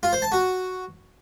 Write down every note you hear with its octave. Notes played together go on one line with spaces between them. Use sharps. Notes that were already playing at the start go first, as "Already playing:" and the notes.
F4
C5
A5
F#4